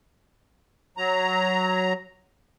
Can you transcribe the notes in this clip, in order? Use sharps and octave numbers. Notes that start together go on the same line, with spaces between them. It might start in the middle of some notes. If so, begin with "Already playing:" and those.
F#3 A#5